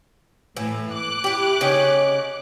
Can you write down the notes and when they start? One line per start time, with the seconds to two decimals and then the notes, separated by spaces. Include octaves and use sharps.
0.56 A2 E3
0.92 D6 F#6
1.24 E4 G4
1.61 C#3 D#4 C#5